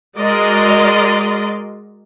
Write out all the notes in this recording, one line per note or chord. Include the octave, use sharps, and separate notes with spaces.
G#3 F#4 A#4 D5 D#5 C6